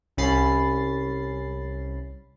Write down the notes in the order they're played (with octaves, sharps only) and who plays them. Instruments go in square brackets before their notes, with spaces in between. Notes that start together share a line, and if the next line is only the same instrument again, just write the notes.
[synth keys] C2 C#4 B5 A6 C7